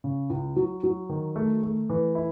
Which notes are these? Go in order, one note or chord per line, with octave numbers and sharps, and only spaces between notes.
C#3
C#2
F#3
F#3
D#3
A3
A3
E3
E4